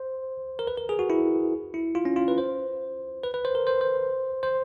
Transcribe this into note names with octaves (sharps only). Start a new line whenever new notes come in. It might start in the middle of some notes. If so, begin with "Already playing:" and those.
Already playing: C5
A#4
B4
A#4
G#4
F#4
E4
E4
F4
C#4
F4
B4
C5
B4
B4
C5
A#4
C5
C5
C5